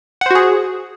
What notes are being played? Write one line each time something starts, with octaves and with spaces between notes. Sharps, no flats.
F#4 G#4 C5 F#5